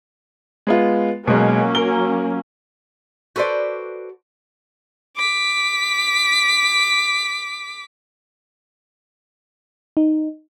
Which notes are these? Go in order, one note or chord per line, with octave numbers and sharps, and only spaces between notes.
G#3 B3 F4
B2 F#3 G#3 A#3 C#4
A#4 G7
F#4 A4 B4 C5 D5
D6 B6
D#4